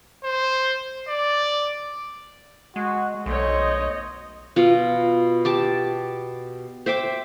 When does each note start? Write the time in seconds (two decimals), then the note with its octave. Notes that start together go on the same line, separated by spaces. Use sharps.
0.24 C5
1.08 D5
2.76 G#3 F#4
3.26 B1 A3 C5 C#5 D#5
4.56 B2 F4
5.45 G4 A5 D6
6.86 C5 E5 G5 D6